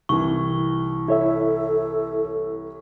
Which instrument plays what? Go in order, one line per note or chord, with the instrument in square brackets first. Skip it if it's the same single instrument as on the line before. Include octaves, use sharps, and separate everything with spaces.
[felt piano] C2 E3 [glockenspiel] C#6
[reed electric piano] E4 C#5 E5 [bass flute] A4